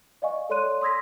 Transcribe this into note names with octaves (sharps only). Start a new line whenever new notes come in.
D5 D#5 F5 G#5 C#6
A4 C#5 D5 C6 F#6 D#7
C6 D#6 E6 G#6 A#6 B6